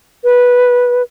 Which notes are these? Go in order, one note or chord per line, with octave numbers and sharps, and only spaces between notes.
B4